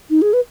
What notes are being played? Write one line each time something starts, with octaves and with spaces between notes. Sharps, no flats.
D#4
G#4
B4